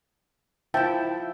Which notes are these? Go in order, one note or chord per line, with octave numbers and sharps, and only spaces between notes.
F3 E4 E5 G5 A5